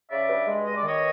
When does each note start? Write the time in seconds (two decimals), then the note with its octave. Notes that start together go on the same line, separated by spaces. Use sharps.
0.11 C#3 D5 E5
0.29 G2
0.47 G#3
0.66 G2 D#5
0.77 D5
0.84 D#3 C#5 D#5